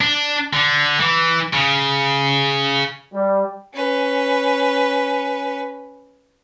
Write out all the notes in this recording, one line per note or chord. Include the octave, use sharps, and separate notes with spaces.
D4
D3
E3
C#3
G3
C#4 B4